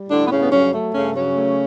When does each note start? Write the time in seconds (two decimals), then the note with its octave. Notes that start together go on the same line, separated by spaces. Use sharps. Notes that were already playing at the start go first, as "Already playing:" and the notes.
Already playing: G3
0.08 A2 D3 D4
0.24 B3
0.30 G2 C#3 C#4
0.40 B3
0.51 C#3 F#3 C#4
0.71 A3
0.92 G2 C#3 C#4
1.13 C#3 F#3 C#4
1.33 A3